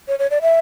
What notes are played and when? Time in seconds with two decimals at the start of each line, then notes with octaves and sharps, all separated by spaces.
0.08 C#5
0.19 C#5
0.31 D5
0.42 E5